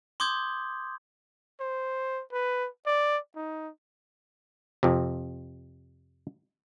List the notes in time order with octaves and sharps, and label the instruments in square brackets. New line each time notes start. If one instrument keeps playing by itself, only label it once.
[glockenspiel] C6 D6 D#6 G6 G#6
[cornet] C5
B4
D5
D#4
[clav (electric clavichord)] F2 C3